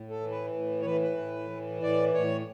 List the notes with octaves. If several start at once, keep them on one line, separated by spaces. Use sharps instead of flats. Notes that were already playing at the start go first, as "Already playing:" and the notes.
Already playing: A2
A4
E3
B4
A2
C#5
E3 B4
B4
A2
E3
A2 D5
A2 C#5